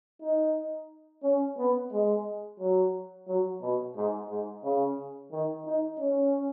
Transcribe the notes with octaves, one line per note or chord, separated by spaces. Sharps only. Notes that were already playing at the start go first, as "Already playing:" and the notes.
D#4
C#4
B3
G#3
F#3
F#3
B2
G#2
G#2
C#3
D#3
D#4
C#4